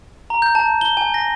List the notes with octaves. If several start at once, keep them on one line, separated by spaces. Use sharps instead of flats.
A#5
G6
A5
G7
G#5
A#6